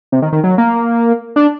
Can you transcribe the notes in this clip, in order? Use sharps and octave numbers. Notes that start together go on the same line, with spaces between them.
C3
D#3
D#3
F#3
A#3
D4